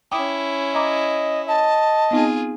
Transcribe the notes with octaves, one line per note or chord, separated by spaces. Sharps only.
C#4 E4 G5 D6 D#6
C#5 D#5 A#5 D6
D#5 A5
B3 C4 D#4 F4 G#4